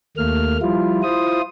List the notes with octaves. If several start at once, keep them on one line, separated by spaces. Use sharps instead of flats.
D#2 A3 A#3 F6
F3 G3 E4 F4
E4 F4 C5 D#6